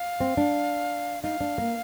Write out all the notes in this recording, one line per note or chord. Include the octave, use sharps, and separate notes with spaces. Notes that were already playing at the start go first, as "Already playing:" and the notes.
Already playing: F5
C4
D4
D#4 F5
D4
A#3